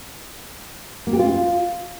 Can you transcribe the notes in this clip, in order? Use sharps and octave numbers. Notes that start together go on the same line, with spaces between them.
A#3
G4
F4